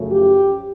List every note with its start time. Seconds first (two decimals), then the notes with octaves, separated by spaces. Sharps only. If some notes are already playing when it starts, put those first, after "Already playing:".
Already playing: F#2 C#3 F3 A3
0.10 G4